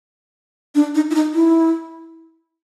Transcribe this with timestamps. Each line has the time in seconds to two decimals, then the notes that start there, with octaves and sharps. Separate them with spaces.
0.75 D4
0.95 D#4
1.11 E4
1.15 D#4
1.34 E4